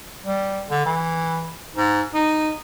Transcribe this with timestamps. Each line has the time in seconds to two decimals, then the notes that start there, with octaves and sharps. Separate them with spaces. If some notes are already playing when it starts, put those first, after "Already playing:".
0.24 G3
0.70 D3
0.86 E3
1.75 G#2
2.14 D#4